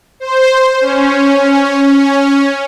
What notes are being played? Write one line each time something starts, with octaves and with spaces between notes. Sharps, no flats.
C5
C#4